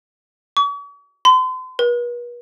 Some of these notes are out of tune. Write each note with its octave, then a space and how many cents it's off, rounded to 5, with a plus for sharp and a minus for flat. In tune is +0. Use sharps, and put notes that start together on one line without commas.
C#6 +45
C6 -40
B4 -40